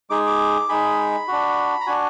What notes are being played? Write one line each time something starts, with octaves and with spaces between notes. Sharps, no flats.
G#3 D#4 G#4 D6
D6
G#3 D#4 G#4 B5
D4 F#4
A#5
D4 F#4 G#5